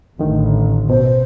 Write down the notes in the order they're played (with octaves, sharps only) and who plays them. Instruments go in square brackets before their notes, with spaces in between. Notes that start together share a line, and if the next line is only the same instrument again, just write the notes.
[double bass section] A1 [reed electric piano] D3 D#3
[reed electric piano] B2 [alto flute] C5